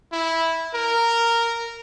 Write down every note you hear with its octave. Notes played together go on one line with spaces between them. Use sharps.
E4
A#4